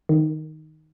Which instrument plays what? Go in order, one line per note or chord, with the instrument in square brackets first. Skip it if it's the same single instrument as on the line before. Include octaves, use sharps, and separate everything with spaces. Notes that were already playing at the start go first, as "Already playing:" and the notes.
[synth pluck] D#3